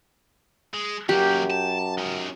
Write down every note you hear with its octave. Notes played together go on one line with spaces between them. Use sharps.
G#3
F#2 F#3 A#3 G4
A5
C#4 D#4